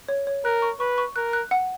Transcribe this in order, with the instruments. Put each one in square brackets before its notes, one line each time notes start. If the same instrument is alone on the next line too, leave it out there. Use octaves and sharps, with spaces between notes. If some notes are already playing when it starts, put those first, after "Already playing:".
[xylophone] C#5
C#5
[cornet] A#4 [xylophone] F#6
[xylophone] C#6
[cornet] B4 [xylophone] C#6
[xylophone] C#6
[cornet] A#4 [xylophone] F#6
[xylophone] F#6
F#5